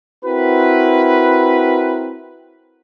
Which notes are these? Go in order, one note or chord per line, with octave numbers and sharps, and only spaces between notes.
C4 E4 F#4 A#4 B4